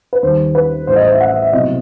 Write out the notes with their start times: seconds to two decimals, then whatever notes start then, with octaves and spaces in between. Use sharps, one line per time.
0.13 B4
0.23 D#2 D#3 G3 C5
0.55 B4
0.87 A1 A2 G3 C5
0.96 D#5
1.04 C5
1.12 E5
1.20 F#5
1.31 E5
1.42 E5
1.53 C2 B2 F#3 A3 D#5